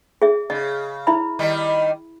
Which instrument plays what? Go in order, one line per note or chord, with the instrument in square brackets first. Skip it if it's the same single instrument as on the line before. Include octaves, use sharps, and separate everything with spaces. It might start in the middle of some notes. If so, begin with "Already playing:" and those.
[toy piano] G#4 E5
[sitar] C#3 [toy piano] D#5
[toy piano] E4 E5 B5
[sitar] D#3 G3 D#4